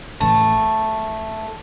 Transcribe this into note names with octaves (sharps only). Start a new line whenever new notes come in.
A1 A2 E3 A3